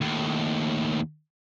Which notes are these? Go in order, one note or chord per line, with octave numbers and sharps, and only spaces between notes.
D#2 A2